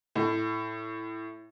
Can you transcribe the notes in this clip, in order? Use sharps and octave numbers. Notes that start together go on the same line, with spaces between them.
A2